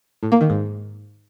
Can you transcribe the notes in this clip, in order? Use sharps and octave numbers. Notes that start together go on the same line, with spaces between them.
A2
A#3
D#3
G#2